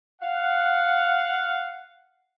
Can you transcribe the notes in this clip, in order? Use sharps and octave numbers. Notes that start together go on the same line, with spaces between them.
F5 F#5